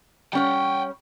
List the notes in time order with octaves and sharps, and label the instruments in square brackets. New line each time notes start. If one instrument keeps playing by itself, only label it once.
[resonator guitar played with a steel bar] G3 C#4 C#5 [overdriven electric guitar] F#5 G5